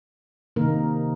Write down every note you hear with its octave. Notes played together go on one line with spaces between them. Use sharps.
C3 D#3 A#3 D#4 A#4